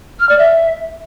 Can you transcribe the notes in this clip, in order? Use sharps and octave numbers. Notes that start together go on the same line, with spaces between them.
F6
D5
E5